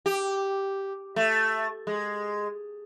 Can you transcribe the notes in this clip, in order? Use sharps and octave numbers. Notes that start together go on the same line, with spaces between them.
G4
A3
G#3